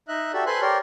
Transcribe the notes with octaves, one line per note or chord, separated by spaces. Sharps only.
D#4 D#5 E5 F#6
F#4 G4 A4 D5 E5
A4 B4 C5 G#5 C6 F#6
G4 A#4 C#5 D5 C6